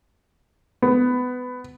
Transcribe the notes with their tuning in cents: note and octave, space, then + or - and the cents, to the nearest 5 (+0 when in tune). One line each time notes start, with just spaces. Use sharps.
B3 +20